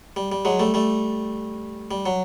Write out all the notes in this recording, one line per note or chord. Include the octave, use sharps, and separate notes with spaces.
G3
G3
F#3 G#3
G3 A3
G3 A3
G3
F#3